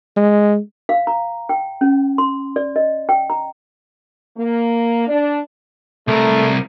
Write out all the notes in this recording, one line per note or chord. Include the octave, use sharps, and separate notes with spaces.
G#3
F5
A#5
G5
C#4
C6
D5
D#5
G5
A#5
A#3
D4
C2 A3 A#4